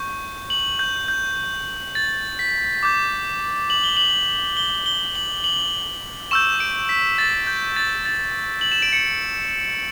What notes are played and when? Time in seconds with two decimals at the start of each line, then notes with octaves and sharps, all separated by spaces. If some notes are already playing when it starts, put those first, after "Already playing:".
Already playing: C#6 G6
0.50 F#7
0.79 G6
1.08 G6
1.95 A6
2.39 B6
2.83 D6 G6
3.70 F#7
3.84 G7
3.97 F#7
4.57 G7
4.86 G7
5.15 F#7
5.44 F#7
6.31 C#6 E6 G6 E7
6.60 D7
6.89 B6
7.18 A6
7.47 G6
7.76 A6
8.05 A6
8.61 F#7
8.72 E7
8.82 D7
8.93 C#7